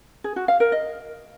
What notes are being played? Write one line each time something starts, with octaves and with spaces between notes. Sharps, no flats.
G#4
F#4
F5
A#4
D#5